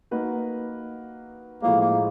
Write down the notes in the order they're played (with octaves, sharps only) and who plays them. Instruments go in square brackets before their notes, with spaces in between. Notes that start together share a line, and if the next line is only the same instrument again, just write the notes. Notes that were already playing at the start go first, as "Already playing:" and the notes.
[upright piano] A#3 D#4 F#4 B4
[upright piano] A2 F3 G#3 [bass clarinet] A#3
[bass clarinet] A#3